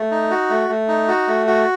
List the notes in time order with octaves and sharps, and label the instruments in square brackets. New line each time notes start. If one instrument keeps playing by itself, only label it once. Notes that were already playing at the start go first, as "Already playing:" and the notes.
Already playing: [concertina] A3
D#4
F#4
A3
A3
D#4
F#4
A3
F#4